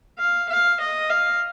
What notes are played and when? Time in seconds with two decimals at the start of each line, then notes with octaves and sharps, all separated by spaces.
0.19 F5
0.49 F5
0.80 D#5
1.10 F5